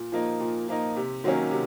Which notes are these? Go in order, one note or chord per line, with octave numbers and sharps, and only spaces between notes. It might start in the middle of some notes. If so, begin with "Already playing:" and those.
Already playing: A#2
F3 A#3 D#4
A#2
F3 A#3 D#4
C3
D#3 F#3 A#3 C#4
C3